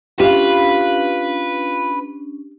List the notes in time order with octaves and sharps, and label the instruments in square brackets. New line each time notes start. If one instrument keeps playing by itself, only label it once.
[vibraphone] C#4 D4 [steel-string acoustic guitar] F4 F5 [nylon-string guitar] G4 [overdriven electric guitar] B4